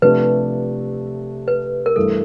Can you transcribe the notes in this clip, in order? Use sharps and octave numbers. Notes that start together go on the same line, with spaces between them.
C3 F3 A3 D4 G4 B4
B4
A#4
G2 E3 A3 A4